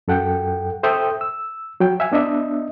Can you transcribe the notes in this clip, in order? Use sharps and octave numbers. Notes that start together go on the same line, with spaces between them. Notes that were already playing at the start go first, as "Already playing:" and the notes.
F#2 A4 F#5 G5
A4 C5 E5 G5 D#6 G6
E6
F#3 G5
E5 F5 G#5
B3 D4 D#5 E5